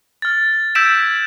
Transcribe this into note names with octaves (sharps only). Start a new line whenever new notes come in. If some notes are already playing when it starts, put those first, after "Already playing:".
F6 A6
E6 G6 G#6 B6 D7 E7